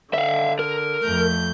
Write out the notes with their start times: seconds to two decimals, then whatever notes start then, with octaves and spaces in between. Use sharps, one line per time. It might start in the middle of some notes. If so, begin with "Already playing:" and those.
0.14 D3 E5 F5
0.59 A#4
1.04 F2 A3 G6